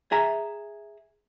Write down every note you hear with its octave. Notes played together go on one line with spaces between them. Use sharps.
G#4 E5 A#5